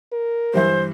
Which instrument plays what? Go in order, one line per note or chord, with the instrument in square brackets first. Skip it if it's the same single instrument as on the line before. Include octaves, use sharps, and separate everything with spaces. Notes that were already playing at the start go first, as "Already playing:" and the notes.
[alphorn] A#4
[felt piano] G2 E3 E5 [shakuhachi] C5